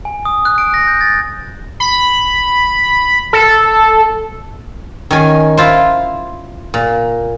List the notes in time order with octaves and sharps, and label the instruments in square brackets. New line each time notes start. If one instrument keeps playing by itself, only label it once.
[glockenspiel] G#5
D#6
F#6
D7
A#6
G6
A6
[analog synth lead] B5
A4
[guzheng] D#3 C#4 G#5
E4 F4 C5
A#2